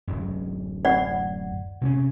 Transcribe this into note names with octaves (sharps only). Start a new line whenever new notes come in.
D1 F#2
D5 F#5
C3 C4 C#4